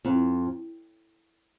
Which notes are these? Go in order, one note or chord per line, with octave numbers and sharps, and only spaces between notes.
F2